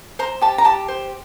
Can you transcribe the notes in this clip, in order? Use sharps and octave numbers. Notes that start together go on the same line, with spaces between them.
C5 A#5
G4 A5
A#5
G4 A5
C5